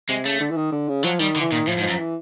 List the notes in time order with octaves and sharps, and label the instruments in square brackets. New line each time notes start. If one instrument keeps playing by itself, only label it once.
[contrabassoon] C3 [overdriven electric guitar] G#3
[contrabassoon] C#3 [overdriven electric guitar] A3
[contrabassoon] D3
E3
D#3
D3
C#3
[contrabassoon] F3 [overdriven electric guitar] F#3
[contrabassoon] D#3 [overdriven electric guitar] G3
[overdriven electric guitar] D3
[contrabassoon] E3
[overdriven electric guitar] A#2 [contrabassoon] D#3
[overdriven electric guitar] A2 [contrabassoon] F3
[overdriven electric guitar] G#2
[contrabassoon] F3
[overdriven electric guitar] F#2
[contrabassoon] F3
E3